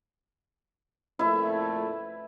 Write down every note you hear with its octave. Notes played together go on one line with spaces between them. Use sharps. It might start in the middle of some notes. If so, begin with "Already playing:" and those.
F2 A#2 A3 E4 B4 E5